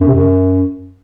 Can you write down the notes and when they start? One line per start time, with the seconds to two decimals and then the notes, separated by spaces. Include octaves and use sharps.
0.01 F#2
0.07 C3
0.14 F#2